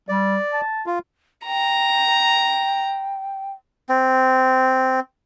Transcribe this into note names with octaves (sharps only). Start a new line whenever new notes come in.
G3 D5
A5
F4
G5 A#5
C4